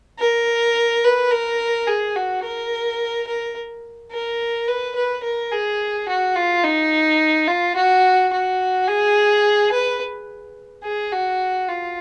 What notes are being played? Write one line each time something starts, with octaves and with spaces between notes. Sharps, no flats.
A#4
B4
A#4
G#4
F#4
A#4
A#4
A#4
B4
B4
A#4
G#4
F#4
F4
D#4
F4
F#4
F#4
G#4
B4
G#4
F#4
F4